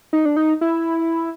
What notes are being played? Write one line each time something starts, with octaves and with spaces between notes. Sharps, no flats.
D#4
D4
D#4
E4